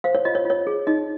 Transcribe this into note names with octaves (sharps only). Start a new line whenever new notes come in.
C5 F5
C#5
F4 D#5
C#5
F4 C#5
G#4
D#4 D#5